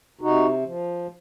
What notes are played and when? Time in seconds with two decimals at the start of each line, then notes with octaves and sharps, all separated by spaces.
0.21 C3 D#4 F#4
0.64 F3